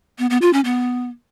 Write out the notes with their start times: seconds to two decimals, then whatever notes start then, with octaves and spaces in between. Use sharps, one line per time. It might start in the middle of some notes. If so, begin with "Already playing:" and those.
0.19 B3
0.30 B3
0.42 F4
0.53 C#4
0.65 B3